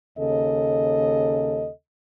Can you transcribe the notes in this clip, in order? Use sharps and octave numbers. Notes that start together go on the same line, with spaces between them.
D#2 C#3 A4 D#5